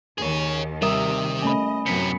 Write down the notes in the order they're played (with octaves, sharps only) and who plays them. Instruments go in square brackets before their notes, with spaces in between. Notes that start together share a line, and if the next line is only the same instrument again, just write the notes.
[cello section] D#2 D#3 [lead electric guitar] G#4 C#5
[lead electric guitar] C3 [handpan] G3 A#4 E5 [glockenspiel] D#6 E7
[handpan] A3 C#4 [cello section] D#5 [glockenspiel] G#5 B5
[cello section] F#2 F#3 B3 [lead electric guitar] A2 C3 [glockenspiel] B6 C#7